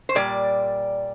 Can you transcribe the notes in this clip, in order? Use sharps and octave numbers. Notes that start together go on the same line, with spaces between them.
C5
A#2 G3 D5